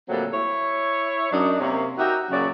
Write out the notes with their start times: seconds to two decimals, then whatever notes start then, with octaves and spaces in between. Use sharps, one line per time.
0.09 A#2 D3 F#3 G3 A3 C4
0.33 E4 C#5
1.31 F#2 D4 D#4
1.59 C3 A#3 C#5
1.97 D#4 F#4 G4 A#4 E5
2.30 F#2 A#2 C#3 F#3 F#4 D5